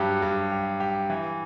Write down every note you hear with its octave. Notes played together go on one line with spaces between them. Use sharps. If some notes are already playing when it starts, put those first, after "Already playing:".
Already playing: G2 F#3 G4
G2
G4
G4
E3